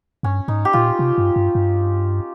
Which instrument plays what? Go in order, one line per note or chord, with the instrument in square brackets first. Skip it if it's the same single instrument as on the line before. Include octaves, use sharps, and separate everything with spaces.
[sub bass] G2 [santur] C#4
[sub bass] G#2 [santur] D#4
[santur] G4
[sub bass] A#2 [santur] F4
[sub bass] C3
G2
G2
G2